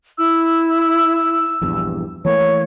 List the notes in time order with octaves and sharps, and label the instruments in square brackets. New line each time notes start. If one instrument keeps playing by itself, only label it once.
[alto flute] E4 [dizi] E6
[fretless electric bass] A#1 E2 G2
[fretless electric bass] E3 A3 A#3 [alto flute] C#5